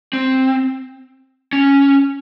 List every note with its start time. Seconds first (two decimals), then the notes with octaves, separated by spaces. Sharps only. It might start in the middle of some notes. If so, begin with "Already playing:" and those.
0.13 C4
1.53 C#4